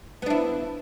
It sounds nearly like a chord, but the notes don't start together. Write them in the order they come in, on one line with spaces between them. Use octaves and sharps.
B3 D4 E4